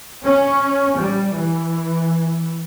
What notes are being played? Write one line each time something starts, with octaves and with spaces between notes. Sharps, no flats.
C#4
G3
E3